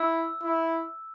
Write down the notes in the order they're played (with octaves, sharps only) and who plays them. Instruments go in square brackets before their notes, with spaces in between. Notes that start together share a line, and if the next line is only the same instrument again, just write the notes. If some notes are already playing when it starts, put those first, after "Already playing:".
Already playing: [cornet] E4 [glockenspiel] E6
[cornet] E4